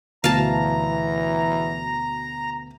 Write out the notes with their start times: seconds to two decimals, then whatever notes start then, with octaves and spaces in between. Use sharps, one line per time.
0.24 D2 B2 E3 F5 A5 A#5